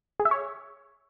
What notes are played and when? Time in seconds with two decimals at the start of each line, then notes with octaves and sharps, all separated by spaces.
0.20 G#4
0.25 E5
0.31 C#5